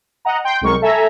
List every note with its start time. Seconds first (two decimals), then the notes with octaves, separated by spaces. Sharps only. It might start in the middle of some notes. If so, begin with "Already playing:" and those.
0.25 D#5 F#5 A#5
0.45 G5 C6
0.61 C2 F#3 G#3 A#4 C#6
0.82 A4 E5 G#5 A#5